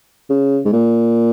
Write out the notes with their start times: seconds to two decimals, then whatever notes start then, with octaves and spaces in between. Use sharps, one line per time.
0.30 C#3
0.65 G#2
0.73 A#2